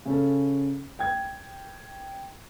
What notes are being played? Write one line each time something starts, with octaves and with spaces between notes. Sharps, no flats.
C#3 C#4 A4
G5 G#6